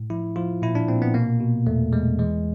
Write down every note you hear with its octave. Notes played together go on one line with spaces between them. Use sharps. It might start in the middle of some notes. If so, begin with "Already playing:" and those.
Already playing: A2
F3 E4
F3 F4
A#2 E4
D4
A#2 C4
B3
B2 A#3
B2
E2 A3
E2 G#3
E3 G#3